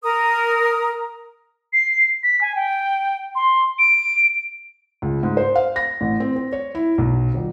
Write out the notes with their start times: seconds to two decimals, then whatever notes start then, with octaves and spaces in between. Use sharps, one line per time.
0.03 A#4 D#6
1.73 C7
2.23 B6
2.41 G#5
2.55 G5
3.35 C6
3.79 D7
5.02 C#2
5.23 G#2
5.37 C5
5.56 F5
5.76 A#6
6.01 A1
6.20 C4
6.36 C4
6.52 C#5
6.75 E4
6.98 B1
7.34 D#1